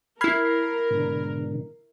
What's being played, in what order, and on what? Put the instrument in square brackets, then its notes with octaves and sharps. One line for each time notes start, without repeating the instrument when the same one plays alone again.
[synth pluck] E4 C7 [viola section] A#4 [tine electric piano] B5 F6 G#6
[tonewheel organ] G#2 B2 D3